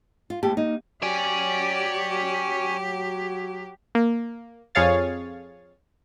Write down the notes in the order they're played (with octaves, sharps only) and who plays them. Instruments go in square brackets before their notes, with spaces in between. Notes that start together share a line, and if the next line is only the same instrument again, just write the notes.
[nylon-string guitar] F4
[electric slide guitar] A2 A#3 A5 [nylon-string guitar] G4
[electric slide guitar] A#3 [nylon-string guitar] D#4
[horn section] F#3 [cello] G4 [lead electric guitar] C#5 G#5 [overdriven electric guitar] D5
[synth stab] A#3
F2 G#4 C#5 F5 A6